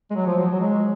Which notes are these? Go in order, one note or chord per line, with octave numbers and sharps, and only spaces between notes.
G#3
F#3
F3
F#3
F#3
G#3